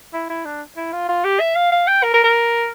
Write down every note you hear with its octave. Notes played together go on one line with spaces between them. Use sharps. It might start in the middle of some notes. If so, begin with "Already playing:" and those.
E4
E4
D4
E4
F4
F4
G4
E5
F5
F5
G5
A#4
A#4
A#4